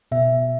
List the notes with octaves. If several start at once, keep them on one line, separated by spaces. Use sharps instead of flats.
B2 E5